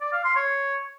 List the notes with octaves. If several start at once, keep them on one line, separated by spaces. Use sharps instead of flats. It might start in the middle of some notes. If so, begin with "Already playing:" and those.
D5
F5
C6
C#5